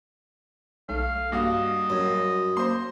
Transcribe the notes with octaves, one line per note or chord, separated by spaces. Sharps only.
B1 A3 F5
G2 A#3 F#4 D#5 F5
F#2
A#3 C5 C6